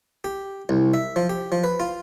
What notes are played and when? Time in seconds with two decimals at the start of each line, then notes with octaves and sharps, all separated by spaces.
0.24 G4
0.69 C2
0.94 E5
1.16 F3
1.29 G4
1.52 F3
1.64 B4
1.80 F4